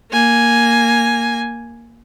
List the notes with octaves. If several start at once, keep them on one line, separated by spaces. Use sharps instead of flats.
A#3 G#5